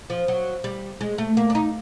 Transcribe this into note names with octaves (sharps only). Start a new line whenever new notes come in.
F3
F#3
G3
G#3
A3
A#3
D4
D#4